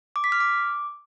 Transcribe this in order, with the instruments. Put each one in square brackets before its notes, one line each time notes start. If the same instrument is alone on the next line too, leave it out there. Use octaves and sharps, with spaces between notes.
[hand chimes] D6
B6
F6
D6